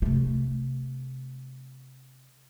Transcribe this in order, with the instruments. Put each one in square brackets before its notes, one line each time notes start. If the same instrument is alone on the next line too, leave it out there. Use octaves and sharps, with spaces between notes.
[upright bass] C3 A3